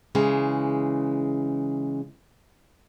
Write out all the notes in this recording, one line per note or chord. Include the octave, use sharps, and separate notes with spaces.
C#3 E3 G#3